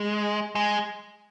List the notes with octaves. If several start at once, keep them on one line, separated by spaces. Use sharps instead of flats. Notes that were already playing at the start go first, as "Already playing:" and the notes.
Already playing: G#3
G#3